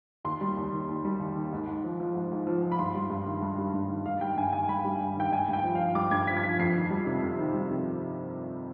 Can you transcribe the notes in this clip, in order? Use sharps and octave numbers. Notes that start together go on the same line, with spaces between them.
D#2 C6
G3
D#2
D#3
D#2
G3
D#2
D#3
G#2
G#2
F3
F3
G#2
G#2
F3
F3
B5
G2 C6
G3
G2
D#3
G2
G3
G2
D#3
G2 F5
G3 G5
G2 G#5
D#3 G#5
G2 B5
G3
G2
D#3 G5
G2 G#5
G2 G5
F3
F5
F3
G2 D6
G2 G#6
F3 B6
G#6
F3 B6
F2 C7
D#3
G3
C3
F2
D#3
G3
C3